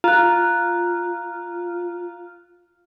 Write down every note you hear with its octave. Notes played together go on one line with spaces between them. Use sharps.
F4 A#5 F#6